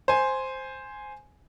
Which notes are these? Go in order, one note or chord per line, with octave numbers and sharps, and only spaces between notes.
C5 G#5